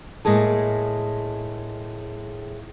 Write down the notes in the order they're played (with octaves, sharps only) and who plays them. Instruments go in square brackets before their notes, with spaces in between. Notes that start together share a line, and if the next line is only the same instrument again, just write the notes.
[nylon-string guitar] A2 G#3 A#3 G#4 A4